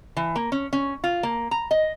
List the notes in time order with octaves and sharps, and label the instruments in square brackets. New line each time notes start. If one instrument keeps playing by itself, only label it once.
[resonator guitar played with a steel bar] E3
A#3
C#4
C#4
F4
A#3
A#5
D#5